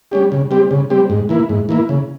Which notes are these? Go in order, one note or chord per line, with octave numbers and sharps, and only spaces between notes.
G3 C#4 G4
C#3
G3 C4 G4
C#3
G3 C4 G4
G#2
E3 A#3 E4
G#2
E3 A#3 E4
C#3